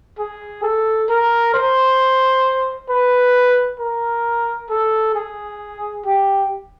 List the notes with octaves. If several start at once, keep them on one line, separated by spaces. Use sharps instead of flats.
G#4
A4
A#4
C5
B4
A#4
A4
G#4
G4